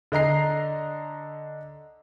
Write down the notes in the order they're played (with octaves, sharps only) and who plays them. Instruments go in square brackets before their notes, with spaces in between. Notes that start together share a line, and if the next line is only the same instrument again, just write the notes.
[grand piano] D3 D#5 A#5 C7